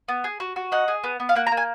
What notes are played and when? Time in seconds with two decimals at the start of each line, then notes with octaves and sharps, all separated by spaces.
0.08 B3
0.24 G#4
0.40 F#4
0.56 F#4
0.72 D#4 F#5
0.88 G#4
1.04 B3
1.20 B3
1.29 F5
1.35 A#3 F#5
1.47 A#5
1.52 A#3
1.57 G#5